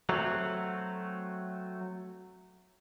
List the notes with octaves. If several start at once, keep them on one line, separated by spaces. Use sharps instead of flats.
F#3 A3 C4